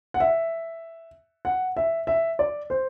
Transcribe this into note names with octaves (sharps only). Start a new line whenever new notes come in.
F#5
E5
F#5
E5
E5
D5
C5